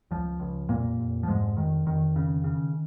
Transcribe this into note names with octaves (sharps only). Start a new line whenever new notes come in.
C#2 F3
C#2
F1 A#2 A#3
F1
F3
F1 G#2 G#3
F1 D#3
F1 D#3
C#3
C#3